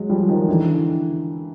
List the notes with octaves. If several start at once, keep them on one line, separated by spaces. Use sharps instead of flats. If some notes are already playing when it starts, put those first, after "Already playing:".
Already playing: F#3 G#3
F3 G3
D#3 F3
D3 E3